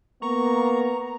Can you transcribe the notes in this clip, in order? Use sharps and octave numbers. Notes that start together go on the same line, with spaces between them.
A#3 B3 A#5 C#6